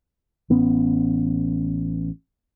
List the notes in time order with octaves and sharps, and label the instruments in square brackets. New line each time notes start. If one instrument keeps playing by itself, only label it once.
[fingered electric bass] A1 B3 C#4